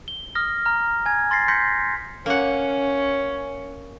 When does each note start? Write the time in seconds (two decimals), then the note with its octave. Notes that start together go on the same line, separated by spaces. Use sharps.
0.08 G7
0.35 D#6 F6 A#6
0.65 A#5 F6
1.06 G#5 G#6
1.31 C6 A6 A#6 C7
1.48 C6 G6 A#6 B6 C#7
2.26 A#3 C#4 F#5